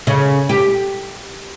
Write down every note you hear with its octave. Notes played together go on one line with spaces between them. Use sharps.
C#3
G4